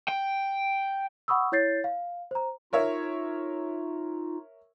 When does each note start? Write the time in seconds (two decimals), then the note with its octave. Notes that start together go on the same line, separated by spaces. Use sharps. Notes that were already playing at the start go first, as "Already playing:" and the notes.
0.08 G5
1.28 F#5 B5 C#6 D#6 E6
1.52 E4 C#5 G6 A6 C7
1.84 F5
2.31 C5 A#5
2.73 D#4 F4 A#4 C#5 E5